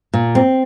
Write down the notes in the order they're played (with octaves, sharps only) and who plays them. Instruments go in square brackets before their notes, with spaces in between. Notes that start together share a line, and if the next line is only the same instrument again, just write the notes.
[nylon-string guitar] A#2
C4